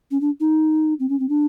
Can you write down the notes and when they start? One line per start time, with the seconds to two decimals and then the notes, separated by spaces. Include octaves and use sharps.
0.11 C#4
0.21 D4
0.40 D#4
1.00 C4
1.09 C#4
1.20 C4
1.29 D4